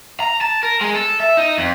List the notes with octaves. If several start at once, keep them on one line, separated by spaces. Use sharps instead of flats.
A#5
A5
A#4
G#3
A4
E5
D#4
F2